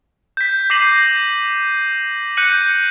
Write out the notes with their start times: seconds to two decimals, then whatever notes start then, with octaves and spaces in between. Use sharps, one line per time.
0.37 G6 B6
0.70 D6 G6 A#6 C7 D#7 F#7
2.37 F#6 G6 C#7 D#7 F#7